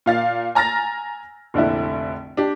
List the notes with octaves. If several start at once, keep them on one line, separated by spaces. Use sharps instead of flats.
A#2 F5 A6
G#5 A#5 F6 A6 A#6
F1 A#1 D3 E4
D4 G4